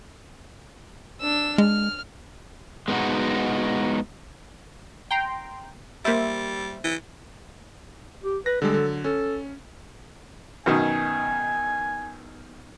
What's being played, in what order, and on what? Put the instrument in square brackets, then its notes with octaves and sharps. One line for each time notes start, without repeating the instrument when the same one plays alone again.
[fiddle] D4 E6
[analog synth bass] G#3 [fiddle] F6
[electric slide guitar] G#3 B3 D#4 F#4
[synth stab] G5 A#5 C6
[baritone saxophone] G3 [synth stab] A#3 C5 E5
[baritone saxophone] E3
[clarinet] G4
[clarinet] B4 [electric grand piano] A#6
[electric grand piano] D3 G3 G#3 [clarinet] A4
[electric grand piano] D3 F#3
[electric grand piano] C#4 [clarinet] A4
[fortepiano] F#2 B2 D#3 [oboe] G#5